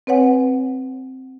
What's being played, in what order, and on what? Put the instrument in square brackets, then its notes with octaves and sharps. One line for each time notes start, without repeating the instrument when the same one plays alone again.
[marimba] C4 B4 C#5 F#5 G#5